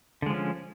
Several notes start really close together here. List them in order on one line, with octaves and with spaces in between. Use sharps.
D3 G#3 F3 C#4